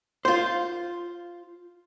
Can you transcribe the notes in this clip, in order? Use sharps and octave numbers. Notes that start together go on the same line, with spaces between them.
F4 C5